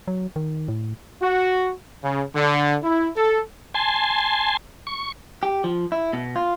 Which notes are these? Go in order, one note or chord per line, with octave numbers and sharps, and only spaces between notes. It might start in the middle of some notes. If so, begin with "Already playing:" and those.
F#3
D#3
A2
F#4
C#3
D3
E4
A4
G#5 A5 C6
C#6
G4
F3
E4
B2
F4